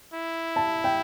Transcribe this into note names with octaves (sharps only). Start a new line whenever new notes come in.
E4
A5
G5